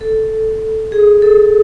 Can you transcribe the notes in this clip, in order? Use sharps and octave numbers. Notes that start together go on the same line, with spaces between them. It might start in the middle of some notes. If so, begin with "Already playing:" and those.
A4
G#4
A4